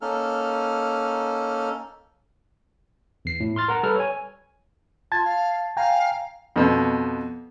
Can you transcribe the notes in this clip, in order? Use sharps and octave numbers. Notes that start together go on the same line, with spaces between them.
A#3 C#4 D#4 A4 F6
E2 C7
A2
C6 F6 A6
A#4 F#5 A#5
G3 A4 B4 F6
C#5 G#5
F4 A5 G#6 A6
F5
F5 G5 G#5 A#5
F2 B2